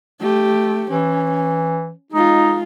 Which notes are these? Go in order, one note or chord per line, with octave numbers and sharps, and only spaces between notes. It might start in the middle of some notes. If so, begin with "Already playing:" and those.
A3 G4
E3 C#4
G#3 D#4 F4